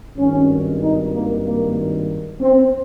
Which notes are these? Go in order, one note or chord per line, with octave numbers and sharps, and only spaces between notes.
G#1 G2 D#3 C#4
D#4
A#3
A#3
C4